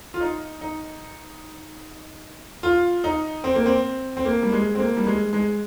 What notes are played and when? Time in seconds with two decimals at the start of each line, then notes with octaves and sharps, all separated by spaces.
0.14 F4
0.20 D#4
0.61 D#4
2.63 F4
3.04 D#4
3.44 C4
3.55 A#3
3.66 C4
4.17 C4
4.25 A#3
4.43 G3
4.52 G#3
4.75 C4
4.79 A#3
4.97 G3
5.07 G#3
5.33 G#3